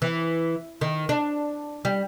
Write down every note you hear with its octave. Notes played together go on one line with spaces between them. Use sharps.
E3
D#3
D4
G3